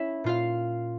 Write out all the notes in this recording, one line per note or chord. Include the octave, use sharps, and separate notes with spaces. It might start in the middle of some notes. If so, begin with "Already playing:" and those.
Already playing: C#4 E4 C#5 E5
A#2 F4 F5